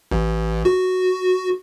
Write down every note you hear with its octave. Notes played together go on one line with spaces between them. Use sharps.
A1
F#4